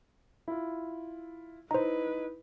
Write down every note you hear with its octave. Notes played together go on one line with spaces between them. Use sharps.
E4 F4
D#4 E4 B4 C5 A#5